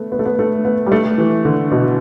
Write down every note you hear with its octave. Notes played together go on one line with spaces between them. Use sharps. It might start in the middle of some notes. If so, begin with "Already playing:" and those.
Already playing: A3 B3
B3
A3
B3
A3
B3
G3
A3
E3
D3
B2